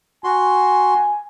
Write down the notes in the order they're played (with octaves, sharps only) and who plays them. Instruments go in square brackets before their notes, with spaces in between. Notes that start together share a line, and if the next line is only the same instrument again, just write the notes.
[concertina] F#4 C6 [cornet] G#5